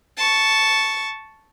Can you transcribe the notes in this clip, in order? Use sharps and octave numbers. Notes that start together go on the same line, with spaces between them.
A5 C#6